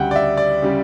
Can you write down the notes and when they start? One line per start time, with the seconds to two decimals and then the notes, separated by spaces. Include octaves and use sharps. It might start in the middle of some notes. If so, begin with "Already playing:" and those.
Already playing: D2 C#3 G3 F#5 G5
0.11 D5
0.16 E5
0.37 D5
0.62 C#3 G3